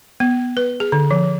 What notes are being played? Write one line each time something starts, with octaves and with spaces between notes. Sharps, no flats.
B3
B4
G#4
D3
F3